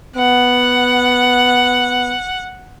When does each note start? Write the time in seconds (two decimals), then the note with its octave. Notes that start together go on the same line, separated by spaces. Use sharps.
0.16 B3 F#5